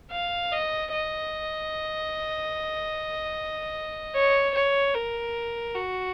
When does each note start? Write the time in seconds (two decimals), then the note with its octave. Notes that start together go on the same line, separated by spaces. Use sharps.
0.11 F5
0.52 D#5
0.92 D#5
4.14 C#5
4.54 C#5
4.94 A#4
5.75 F#4